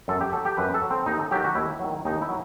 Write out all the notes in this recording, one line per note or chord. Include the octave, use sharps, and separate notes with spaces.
F#2 A4
G4
F#3 A4
G4
F#2 B4
A4
F#3
C4
D#2 D#4
A4
D#3 F#3 G4
F#4
D#2 E4
D#3 F#3
D#2 D#4
E4
F#3